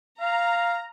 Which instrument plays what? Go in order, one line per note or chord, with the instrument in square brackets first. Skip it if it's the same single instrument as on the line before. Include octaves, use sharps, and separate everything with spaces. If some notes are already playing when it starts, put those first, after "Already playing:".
[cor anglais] F5 [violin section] A#5